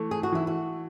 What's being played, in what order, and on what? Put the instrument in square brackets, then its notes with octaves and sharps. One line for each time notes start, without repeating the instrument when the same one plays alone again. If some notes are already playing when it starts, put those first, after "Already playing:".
Already playing: [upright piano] E3 A3
[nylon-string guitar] G#4
F#4
[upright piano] E3 [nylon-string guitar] E4
[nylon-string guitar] F#4